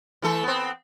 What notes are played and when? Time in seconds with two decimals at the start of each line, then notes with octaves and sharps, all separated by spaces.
0.22 E3 A3 A4
0.43 B3 C4